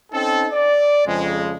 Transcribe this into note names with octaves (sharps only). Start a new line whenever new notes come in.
C4 C#4 D#4 A4
D5
F2 C#3 F3 G#3